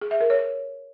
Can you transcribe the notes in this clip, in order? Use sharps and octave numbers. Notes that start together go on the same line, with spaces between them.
G#4
E5
A#4
C#5